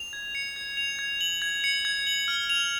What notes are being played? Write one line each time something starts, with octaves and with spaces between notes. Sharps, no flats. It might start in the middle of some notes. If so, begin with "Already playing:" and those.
Already playing: F7
G#6
C#7
G#6
F7
G#6
F#7
G#6
C#7
G#6
F#7
F6
F7